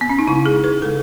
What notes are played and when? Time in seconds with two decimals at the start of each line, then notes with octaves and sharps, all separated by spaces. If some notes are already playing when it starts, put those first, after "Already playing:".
0.01 B3
0.10 C#4
0.19 D#4
0.28 C#3 G#3 E4
0.46 G#4
0.64 B4
0.82 C#3 G#3 A4